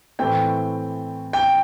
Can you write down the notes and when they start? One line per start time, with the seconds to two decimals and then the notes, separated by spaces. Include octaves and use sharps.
0.19 A2 E3 A3 C4 G5
1.33 G5